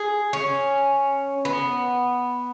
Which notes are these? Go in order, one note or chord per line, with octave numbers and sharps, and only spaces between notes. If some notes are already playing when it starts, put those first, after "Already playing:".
Already playing: G#4
C#4
B3